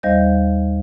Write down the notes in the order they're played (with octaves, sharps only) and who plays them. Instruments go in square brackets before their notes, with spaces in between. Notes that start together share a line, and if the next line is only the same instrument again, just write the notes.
[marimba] D#2 G3 C5 D#5 F5 G6